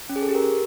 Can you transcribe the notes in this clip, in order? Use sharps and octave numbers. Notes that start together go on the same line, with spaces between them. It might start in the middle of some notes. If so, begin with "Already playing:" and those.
C#4
G#4
A4
G4
A#4